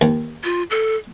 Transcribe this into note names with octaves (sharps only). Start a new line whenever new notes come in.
D#2
F4
A4